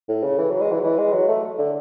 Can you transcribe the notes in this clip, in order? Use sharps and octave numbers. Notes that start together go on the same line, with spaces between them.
A2
C#3
E3
F#3
G#3
E3
F#3
E3
G#3
F#3
A3
D3